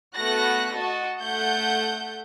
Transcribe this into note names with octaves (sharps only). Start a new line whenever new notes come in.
A3 B3 F#4 F#6 A#6
F#4 D#5 A5
A3 F#5 G6